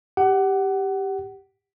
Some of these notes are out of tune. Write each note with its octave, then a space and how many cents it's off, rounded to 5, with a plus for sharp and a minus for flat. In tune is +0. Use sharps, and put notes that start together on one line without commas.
G4 +0 F#5 +25